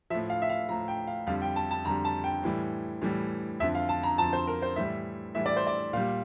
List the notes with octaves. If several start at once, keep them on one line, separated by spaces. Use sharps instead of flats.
A2 F3 E5
F5
E5
F5
A2 F3 A#5
G5
F5
F2 D3 G3 F5
G5
A5
A5
F2 D3 G3 A#5
A5
G5
A2 E3 G3
A2 E3 G3
F2 D3 F3 E5
F5
A5
A#5
F2 D3 F3 A5
C5
A#4
C5
A2 E3 G3 E5
A2 E3 G3 E5
D5
C5
D5
A#2 G3 F5